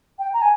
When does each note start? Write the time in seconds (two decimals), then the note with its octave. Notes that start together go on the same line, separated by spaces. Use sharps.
0.19 G5
0.34 A#5
0.42 G#5